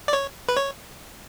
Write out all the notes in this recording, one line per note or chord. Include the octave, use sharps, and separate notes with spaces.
D5
C#5
B4
C#5